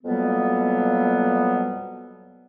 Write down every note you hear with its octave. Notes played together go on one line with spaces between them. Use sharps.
F2 B2 F#3 G3 A#3 B3